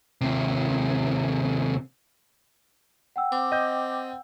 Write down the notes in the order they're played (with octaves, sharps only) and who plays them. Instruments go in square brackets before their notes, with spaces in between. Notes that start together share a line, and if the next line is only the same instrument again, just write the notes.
[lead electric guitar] D#2 C3
[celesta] F#5 G5 E6
[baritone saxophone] C4 [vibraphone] D6
[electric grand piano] D#5 G6